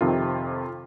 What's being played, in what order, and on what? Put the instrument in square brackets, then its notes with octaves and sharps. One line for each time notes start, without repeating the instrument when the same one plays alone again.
[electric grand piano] F2 C3 D#3 F4